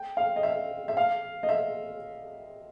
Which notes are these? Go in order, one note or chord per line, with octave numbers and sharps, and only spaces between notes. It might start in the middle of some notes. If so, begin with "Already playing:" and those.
Already playing: G5
F5
D#5
E5
E5
F5
D#5
E5